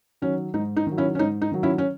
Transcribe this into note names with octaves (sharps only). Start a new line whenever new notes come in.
D#3 F#3 C#4
G#2 D#4
D#4
D#3 F#3
C#4 E4
C#4
G#2 D#4
D#4
D#3 F#3
C#4 E4
C#4